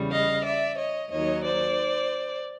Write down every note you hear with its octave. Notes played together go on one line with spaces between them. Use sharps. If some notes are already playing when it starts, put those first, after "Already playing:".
Already playing: E2 C#3 G3
D#5 F5
D5 E5
C#5 D#5
D#2 D#3 F#3 C#5 D#5
C5 D5